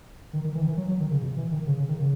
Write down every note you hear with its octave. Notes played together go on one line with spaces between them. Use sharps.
D#3
D#3
E3
D#3
E3
F#3
F#3
D#3
C#3
B2
E3
D#3
C#3
C#3
D#3
C#3